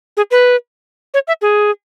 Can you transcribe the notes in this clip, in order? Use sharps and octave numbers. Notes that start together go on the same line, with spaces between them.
G#4
B4
C#5
E5
G#4